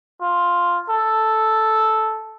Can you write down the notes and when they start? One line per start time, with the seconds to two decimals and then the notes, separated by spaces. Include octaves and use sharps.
0.21 F4
0.89 A4